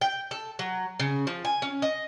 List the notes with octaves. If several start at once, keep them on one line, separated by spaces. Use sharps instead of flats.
G5
A4
F#3
C#3
F3
G#5
C#4
D#5